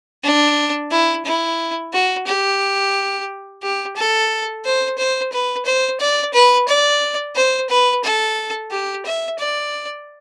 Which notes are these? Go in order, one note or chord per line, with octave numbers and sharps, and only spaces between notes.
D4
E4
E4
F#4
G4
G4
A4
C5
C5
B4
C5
D5
B4
D5
C5
B4
A4
G4
E5
D5